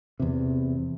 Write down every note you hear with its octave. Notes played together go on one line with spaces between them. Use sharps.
E2 C3